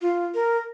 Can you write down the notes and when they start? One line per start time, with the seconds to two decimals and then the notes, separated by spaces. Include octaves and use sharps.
0.02 F4
0.35 A#4